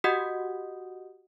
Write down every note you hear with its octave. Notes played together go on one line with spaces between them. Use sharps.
F#4 G4 D#5 F#5 D#6 G6